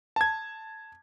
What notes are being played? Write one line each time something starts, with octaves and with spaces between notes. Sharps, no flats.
A5 G#6